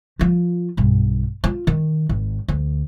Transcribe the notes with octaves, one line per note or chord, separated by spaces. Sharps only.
F3 F4
B1 G2
F4
D#3
G#1
D2